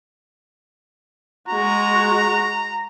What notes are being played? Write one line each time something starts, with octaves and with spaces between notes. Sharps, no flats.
G#3 F#4 A#5